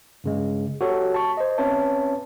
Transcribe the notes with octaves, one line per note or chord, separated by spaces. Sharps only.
G2 C#3 G#3
F#4 G4 A4 C#5
A5 C#6
C5 D#5
C4 C#4 B4 C#5 E5 A5